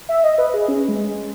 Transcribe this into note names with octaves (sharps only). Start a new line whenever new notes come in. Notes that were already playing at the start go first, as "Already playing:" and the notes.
E5
D#5
B4
G#4
C#4
G#3
G#3